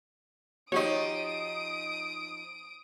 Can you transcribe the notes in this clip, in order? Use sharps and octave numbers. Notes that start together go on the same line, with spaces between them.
F3 D#4 F#4 G4 C#5 D#5 D#6 D7